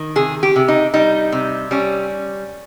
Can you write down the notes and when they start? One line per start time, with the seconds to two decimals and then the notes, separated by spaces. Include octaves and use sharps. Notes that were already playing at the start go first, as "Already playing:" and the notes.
Already playing: D#3
0.16 C3 G#4
0.43 G4
0.56 C3
0.68 D#4
0.94 G3 D#4
1.32 C3
1.71 G3 C#4